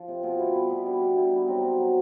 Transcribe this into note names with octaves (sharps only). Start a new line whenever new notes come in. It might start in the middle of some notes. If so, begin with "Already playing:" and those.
Already playing: F3
C3
B2 F4
G3 E4
B2 E4
B2
G3 D4
B2 D4
B2 E4
D#4
G3
F#3 C4
B2
F#3